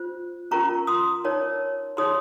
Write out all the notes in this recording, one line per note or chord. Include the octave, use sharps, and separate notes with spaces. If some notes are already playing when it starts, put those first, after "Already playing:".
Already playing: F4 C5
C#4 F4 A#4 A#5 C#6
C6 D#6
D#4 A#4 C#5
D#4 G#4 C#5 C6 D#6